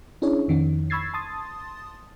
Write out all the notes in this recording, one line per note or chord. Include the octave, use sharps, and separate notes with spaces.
C#4 D4 E4 G#4 C#5
F2 D#3 C#4
B5 C#6 E6 G#6 A6 C7
A5 C6 D#6 A6